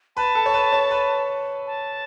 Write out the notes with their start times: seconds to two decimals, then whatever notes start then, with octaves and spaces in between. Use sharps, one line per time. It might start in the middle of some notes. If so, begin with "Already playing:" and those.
0.16 B4 A5
0.35 A4
0.46 C#5
0.54 B4
0.72 C#5
0.91 B4
1.66 A5